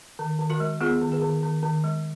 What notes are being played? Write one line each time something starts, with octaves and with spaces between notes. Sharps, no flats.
D#3
D#3
F#4 A#4
G#3
B3 F4 G#4
D#3
G#4 B4
D#3
D#3
D#3
G#3